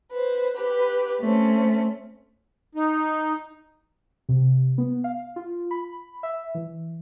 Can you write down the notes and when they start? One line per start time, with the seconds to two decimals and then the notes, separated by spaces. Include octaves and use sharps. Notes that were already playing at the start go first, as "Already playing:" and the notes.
0.12 B4 C5
0.56 G4 B4
1.21 A3 C4 C#4
2.75 D#4
4.29 C3
4.78 B3
5.04 F5
5.36 F4
5.71 B5
6.23 E5
6.55 E3